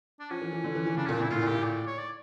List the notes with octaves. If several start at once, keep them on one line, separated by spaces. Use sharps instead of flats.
D4
F3 C#4
E3
E3
D3
E3
E3
C#3 D4
A#2 C#4
D4
A#2
E4
A2 F4
A#2
G4
A2
D5
C#5
D5